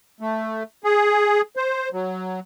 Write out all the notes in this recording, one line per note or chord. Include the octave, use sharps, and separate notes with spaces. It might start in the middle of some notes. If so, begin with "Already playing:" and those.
A3
G#4
C5
F#3